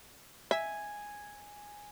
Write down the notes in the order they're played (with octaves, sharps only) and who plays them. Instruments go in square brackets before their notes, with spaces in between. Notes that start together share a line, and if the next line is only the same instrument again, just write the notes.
[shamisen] E5 [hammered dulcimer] G#5